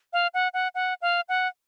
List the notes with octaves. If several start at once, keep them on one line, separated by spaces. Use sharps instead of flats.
F5
F#5
F#5
F#5
F5
F#5